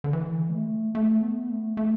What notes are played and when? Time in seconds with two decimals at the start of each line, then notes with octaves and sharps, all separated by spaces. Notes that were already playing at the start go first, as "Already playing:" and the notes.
0.04 D3
0.13 E3
0.50 G#3
0.54 A3
0.95 A3
1.22 B3
1.49 A3
1.77 A3